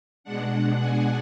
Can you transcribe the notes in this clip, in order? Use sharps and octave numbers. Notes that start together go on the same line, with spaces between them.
B2 G#3 D4 F#5
G#5